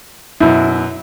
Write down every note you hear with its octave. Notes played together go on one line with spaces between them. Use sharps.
F#2 B2 E4